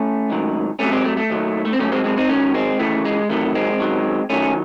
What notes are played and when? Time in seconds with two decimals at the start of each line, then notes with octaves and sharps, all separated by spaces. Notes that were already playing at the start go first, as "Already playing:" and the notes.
Already playing: A3 C#4
0.30 G#2 D#3 F#3
0.79 C2 C3 F#3 A3 C#4
0.92 G#3 C4
1.05 A3
1.17 A3
1.30 D#2 D#3 F#3
1.65 A3
1.73 C4
1.79 G#2 F#3 A3 C#4
1.92 G#3 C4
2.04 G#3 C4
2.17 C4 D#4
2.29 G#2 D#3 F#3 A3 C#4
2.54 G#3 C4
2.79 D#2 C#3 E3 A3
3.05 G#3
3.29 E2 C3 D#3 F#3 A3
3.55 G#3 C4
3.80 F#2 D#3 F#3
4.30 D#2 D#3 F#3 A3 C#4